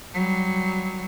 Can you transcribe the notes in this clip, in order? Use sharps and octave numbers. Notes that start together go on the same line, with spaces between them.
F#3 G3